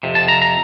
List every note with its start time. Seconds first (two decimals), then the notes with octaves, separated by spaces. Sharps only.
0.03 F2 C3
0.15 A5
0.28 A#5
0.42 A#5